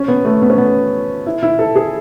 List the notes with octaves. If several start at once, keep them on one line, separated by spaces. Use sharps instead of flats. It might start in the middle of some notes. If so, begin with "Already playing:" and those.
Already playing: C#4
B3
A3
B3
C#4
B3
E4
E4
A4
G#4